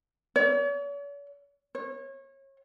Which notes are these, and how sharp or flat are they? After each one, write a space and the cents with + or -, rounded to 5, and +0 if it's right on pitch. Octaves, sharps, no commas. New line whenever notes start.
C#5 +45
C#5 -30